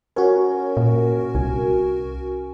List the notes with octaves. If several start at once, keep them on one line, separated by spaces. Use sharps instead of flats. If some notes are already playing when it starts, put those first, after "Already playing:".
C#4 F#4 A#4
A#2
C2 G#5